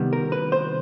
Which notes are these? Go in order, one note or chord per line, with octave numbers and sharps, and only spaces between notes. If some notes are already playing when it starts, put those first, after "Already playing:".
Already playing: C3 D#3 G3 B3
A#4
B4
C5